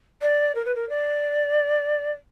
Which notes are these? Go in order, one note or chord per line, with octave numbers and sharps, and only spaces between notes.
D5
A#4
B4
A#4
D5